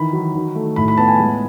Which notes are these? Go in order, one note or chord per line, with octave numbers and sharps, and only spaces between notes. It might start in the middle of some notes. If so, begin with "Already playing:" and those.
Already playing: D#3 E3 B5
F#3
D#3
A3
A2 B5
B5
B3 A5
G#5
G#3